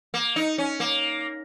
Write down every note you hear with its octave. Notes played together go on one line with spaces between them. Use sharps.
A#3
D#4
C#4
A#3